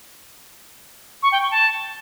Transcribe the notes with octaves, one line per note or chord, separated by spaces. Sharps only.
C#6
G5
C#6
A5